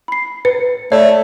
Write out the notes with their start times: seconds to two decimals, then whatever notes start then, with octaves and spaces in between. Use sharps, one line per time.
0.08 B5 C7
0.45 B4 C#7
0.92 A3 C#5 D5 E5